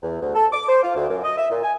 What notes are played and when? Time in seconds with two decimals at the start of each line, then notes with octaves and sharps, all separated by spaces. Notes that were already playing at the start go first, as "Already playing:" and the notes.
0.02 E2
0.21 D2
0.35 A4
0.53 D6
0.68 C5
0.83 F4
0.95 D2
1.09 F#2
1.24 D#5
1.37 E5
1.50 A#2
1.63 G#5